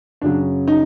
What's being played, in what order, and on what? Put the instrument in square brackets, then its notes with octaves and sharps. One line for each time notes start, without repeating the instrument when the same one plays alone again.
[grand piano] F#2 C#3 F#3 D4
D#4